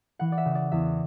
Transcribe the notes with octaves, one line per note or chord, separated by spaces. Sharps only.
E3 F#5
D5
E5
C#3
D5
E2 E5